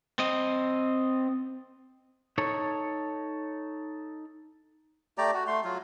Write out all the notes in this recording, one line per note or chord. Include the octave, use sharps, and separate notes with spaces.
C4 D#5
D#4 A4 C#5
A3 G4 D5 A#5
F#4
A3 C6
F#3 F4